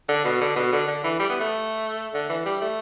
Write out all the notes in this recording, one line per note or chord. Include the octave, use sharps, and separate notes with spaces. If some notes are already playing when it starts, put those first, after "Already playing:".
D3
B2
D3
B2
D3
D3
E3
G3
B3
A3
D3
E3
G3
A3